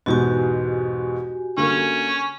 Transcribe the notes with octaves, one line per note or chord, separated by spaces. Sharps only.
E2 G#2 B2 F#4 G4 G#5
D3 A#3 C#4